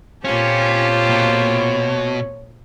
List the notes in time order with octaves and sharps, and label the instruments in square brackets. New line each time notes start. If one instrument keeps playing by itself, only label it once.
[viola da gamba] A#2 A#3 C4 [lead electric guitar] C#4 [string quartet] F4 G4 A4 [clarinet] C#5
[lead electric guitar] B2